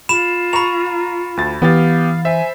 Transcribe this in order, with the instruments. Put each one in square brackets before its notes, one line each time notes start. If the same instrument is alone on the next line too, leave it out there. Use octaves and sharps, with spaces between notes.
[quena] F4 [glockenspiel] B5 E7 F7
[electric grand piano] A#5 C#6 [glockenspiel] B5 F7
[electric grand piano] D2 A6
[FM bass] E3 [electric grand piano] B3 G4 A6 [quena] F5
[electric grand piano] C5 E5 [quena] G#5